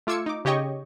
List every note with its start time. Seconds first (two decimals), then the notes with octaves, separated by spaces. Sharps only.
0.07 A3 F4 D6 E6 G#6 C#7
0.26 D#4 D6
0.45 C#3 G4 C#5 D#5 G5 C#6